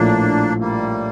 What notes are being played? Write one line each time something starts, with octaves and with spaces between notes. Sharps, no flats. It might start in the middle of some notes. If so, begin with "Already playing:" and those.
Already playing: A#1 A2 F3 A#3 D4
G3 A#3